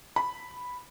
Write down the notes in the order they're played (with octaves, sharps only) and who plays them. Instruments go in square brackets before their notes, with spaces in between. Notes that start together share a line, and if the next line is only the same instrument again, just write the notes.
[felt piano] B5